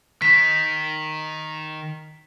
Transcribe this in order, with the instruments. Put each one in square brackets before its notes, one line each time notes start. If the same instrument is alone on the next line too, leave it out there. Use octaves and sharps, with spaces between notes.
[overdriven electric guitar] D#3 [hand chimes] B6